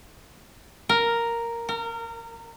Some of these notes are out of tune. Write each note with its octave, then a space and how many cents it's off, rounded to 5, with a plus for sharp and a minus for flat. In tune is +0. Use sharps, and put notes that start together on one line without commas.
A#4 +0
A#4 -25